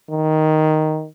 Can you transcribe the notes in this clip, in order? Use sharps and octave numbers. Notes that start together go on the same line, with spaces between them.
D#3